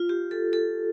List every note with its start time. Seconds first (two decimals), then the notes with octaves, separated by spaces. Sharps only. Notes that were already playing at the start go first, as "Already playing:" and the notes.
Already playing: F4
0.09 G4
0.31 A4
0.53 A4